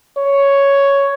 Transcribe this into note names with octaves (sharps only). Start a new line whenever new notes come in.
C#5